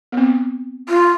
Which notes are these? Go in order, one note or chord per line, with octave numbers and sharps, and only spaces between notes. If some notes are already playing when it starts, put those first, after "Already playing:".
B3
C4
F4